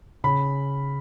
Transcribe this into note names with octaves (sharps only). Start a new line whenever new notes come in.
C#3 B5